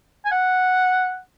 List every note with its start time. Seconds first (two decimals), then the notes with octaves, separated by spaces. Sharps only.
0.25 G#5
0.31 F#5